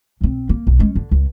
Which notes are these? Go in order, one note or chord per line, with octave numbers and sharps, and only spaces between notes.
B1 C4
A#3
B1
G#3 C#4
D3
C#2